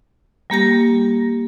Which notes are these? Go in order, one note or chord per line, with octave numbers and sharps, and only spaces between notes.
G3 A#3 G4 A#6